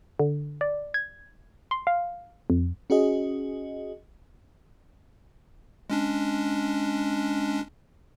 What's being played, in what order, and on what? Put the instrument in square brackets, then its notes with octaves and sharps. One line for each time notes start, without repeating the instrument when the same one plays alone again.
[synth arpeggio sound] D3
D5
G#6
C6
F5
F2
[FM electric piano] C#4 F#4 G#4 D#5
[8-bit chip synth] G#3 C#4 D4